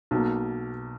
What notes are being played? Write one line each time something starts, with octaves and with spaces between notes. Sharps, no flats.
B1 B2 A#3